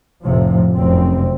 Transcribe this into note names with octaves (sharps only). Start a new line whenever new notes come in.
F1 A2 C3 F3
F1 F#2 C4